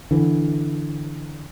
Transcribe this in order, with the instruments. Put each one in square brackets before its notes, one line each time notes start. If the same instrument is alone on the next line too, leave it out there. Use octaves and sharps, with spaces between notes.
[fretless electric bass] D3 E3